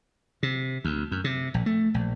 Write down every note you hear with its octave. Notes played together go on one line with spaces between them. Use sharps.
C3
D2
F#2
C3
A#1
A3
A#1